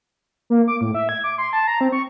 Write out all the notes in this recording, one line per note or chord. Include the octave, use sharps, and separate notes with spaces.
A#3
D6
A2
E5
G#6
D6
C6
A5
A#5
C4
C#6